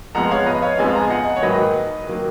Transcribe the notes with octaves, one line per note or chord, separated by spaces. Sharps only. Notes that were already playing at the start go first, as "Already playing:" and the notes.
F2 F3 G#3 B3 F#5 A#5
C#5 F5
B4 D#5
C#5 F5
F2 F3 G#3 B3 F5 G#5
A#5
G#5
D#5 F#5
C#5
G#2 D#3 F#3 A#3 B4 D#5
D#3 F#3 A#3